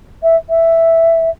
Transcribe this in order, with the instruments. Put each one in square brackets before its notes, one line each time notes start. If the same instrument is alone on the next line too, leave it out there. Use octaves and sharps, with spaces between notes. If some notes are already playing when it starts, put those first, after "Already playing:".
[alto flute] E5
E5